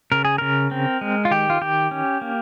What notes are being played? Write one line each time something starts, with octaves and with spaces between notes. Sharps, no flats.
C#3 A#4
G#4
C#3 A#4
C4
G#3
F4
D#3 G4
F4
D#3 G4
C#4
A#3